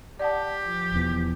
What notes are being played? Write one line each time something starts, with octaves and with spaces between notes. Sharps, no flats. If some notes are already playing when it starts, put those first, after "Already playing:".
G4 D5 F#5 A5
F3
E1 E2